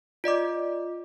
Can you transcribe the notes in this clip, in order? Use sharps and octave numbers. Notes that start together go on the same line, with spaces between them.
F4 D5 D#5 D6